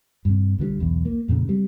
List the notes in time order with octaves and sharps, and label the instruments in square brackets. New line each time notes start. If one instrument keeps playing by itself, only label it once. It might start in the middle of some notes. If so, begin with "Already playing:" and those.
[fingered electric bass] G2 C3
C2 D3 D#3 G3
B1 E2
A#3
F2 A#2 C#3
C3 G3